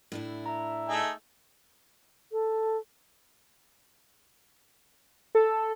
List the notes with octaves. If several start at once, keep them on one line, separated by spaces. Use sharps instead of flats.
A2 D4 E4
E5 A#5
A3 D#4 G#4
A4
A4